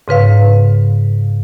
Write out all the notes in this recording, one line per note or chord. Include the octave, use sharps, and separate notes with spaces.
G#2 C#3 B4 F5